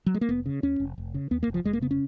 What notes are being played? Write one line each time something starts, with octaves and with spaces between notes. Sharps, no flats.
F#3
G#3
A#3
F1 B3
C#3
D#2 C#4
F1
F1
C#3
D#2 B3
A#3
F1
F3
F1 G#3
A#3
C#3 B3
C#4